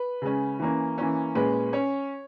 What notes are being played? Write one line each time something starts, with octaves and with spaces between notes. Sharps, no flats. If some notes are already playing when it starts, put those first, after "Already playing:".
Already playing: B4
C#3 G#3 C#4
E3 A#3 C#4
E3 A#3 C#4
A#2 G#3 C#4 B4
C#4 C#5